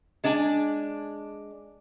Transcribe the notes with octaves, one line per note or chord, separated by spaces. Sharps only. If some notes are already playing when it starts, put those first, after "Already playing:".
G#3 D4 D5 G#5